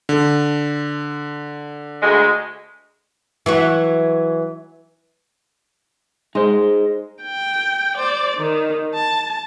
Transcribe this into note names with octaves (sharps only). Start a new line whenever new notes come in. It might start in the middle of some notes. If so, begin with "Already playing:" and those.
D3
D2 G#3
E3 F#3 F#4
G#3 D#4 C5
G5
C5 D5
D#3
A5